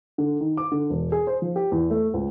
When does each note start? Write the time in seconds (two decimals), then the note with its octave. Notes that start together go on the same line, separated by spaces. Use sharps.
0.18 D3
0.41 D#3
0.57 D6
0.72 D3
0.90 E1
1.12 G#4
1.27 C5
1.42 F3
1.56 G4
1.72 E2
1.91 A3
2.14 C#2